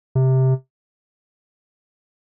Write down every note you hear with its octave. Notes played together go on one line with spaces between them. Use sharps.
C3